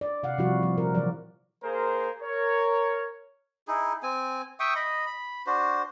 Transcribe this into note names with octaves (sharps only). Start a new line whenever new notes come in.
D5
C3 F5 F#5
C3 F3 G3 E4 F#4
F3 A#3
A#2 A#4
E3 F#3 D5
A#3 G#4 A#4 C5
A#4 C#5
D#4 E4 G#4
C4 G#5
E5 G5 C#6 D#6
D#5 B5
B5
D4 F#4 C5